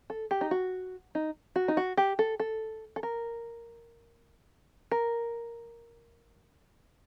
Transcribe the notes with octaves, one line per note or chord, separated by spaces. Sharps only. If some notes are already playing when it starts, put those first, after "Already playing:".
A4
G4
D#4
F#4
D#4
F#4
D#4
F#4
G4
A4
A4
A4
A#4
A#4